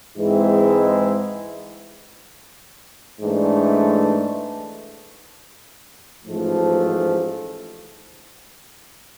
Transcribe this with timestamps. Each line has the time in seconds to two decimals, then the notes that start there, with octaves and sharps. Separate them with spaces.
0.16 G#2 E3 G#3 C4 E4
3.20 G#2 E3 A3 D4
6.25 A1 G#2 F3 A3